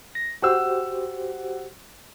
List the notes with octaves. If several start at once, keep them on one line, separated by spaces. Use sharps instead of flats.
A#6
F#4 G4 C5 F#5 E6